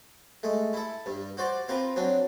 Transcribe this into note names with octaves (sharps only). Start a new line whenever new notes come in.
G#3 A3
E4 A4
G2
F#4 C5 D5
C4 F4 B4 A#5
F#3 C4 D4